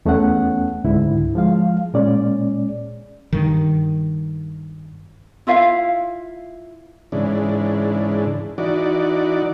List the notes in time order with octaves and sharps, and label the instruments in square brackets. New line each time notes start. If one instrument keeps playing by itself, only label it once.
[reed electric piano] E2 A3 B3 C#4 F#5
C#2 G#2 D3 E4
F3 G#3 F5
A#2 G#3 C#4 D5
[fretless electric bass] G2 D#3
[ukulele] E4 F4 E5 F5
[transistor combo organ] G#2 C#3 E3 D4
E3 D#4 F#4 D5